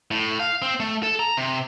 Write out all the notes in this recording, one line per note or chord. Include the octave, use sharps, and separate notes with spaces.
A2
F5
C4
A3
A4
A#5
C3